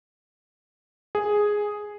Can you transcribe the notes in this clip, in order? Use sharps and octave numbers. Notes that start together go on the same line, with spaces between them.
G#4